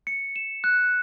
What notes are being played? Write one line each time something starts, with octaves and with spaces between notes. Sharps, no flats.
C#7
E7
F#6